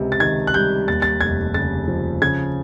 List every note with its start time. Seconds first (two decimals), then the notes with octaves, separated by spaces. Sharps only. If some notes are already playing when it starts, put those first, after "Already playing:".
Already playing: C#2 C3
0.12 A6
0.20 D#3 G#6
0.47 F#6
0.54 G3 G6
0.88 D#2 A6
1.02 A6
1.21 F1 G#6
1.54 C#3 A6
1.88 F3
2.21 C#3 G#6